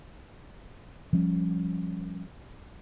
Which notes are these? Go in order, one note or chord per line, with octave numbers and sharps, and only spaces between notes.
F3 G3 C#4